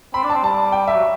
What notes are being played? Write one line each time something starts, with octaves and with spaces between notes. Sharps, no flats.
C4 B5
D4
C4 A5
G3 A5
G5
E5
F#3